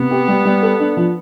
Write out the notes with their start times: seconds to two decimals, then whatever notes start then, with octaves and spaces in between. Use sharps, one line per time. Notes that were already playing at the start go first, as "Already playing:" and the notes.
Already playing: C3 B3
0.11 G4
0.28 G3
0.45 G3
0.62 A4
0.80 D4
0.97 F3